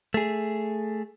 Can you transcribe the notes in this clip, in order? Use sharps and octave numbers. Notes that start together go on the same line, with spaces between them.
A3 G#4